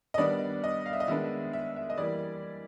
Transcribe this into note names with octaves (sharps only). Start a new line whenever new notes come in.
D#5
D#3 G3 B3 D4 D5
D#5
F5
E5
D#5
D#3 G#3 B3 D4 E5
E5
E5
D#5
E3 G3 A#3 D5